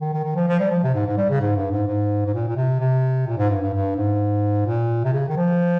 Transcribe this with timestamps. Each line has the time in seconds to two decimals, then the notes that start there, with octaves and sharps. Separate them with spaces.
0.01 D#3
0.13 D#3
0.24 D#3
0.36 F3
0.48 F3
0.60 G3
0.71 F3
0.83 C3
0.94 G#2
1.06 G#2
1.17 G3
1.30 C#3
1.41 G#2
1.56 G2
1.71 G#2
1.87 G#2
2.26 G#2
2.34 A#2
2.48 A#2
2.56 C3
2.80 C3
3.27 A#2
3.38 G#2
3.50 G2
3.62 G2
3.73 G2
3.96 G#2
4.66 A#2
5.04 C3
5.13 C#3
5.28 D#3
5.36 F3